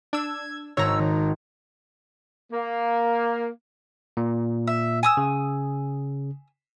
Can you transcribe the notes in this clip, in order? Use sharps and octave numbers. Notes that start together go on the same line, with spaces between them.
D4 E6 G#6
G#1 C#5 A#5 E6
D#3
A#3
A#2
E5
G#5 D#6 E6
C#3